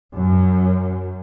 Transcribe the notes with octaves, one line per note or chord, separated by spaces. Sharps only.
F#2